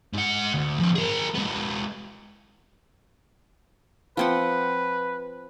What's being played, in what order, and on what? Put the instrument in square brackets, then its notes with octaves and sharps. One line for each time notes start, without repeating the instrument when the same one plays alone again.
[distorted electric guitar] G#2 F#5
D2
F3 B3
G#4 A#4
G#3 B3
[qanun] F3 C4 F#5 [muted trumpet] B4